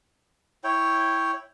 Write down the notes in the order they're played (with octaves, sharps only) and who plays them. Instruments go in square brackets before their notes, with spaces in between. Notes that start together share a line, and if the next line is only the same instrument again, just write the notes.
[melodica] E4 C#5 G5